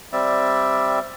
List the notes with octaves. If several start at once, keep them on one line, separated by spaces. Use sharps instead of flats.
G3 C4 D5 E5